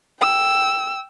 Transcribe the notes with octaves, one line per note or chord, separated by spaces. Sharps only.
G5 E6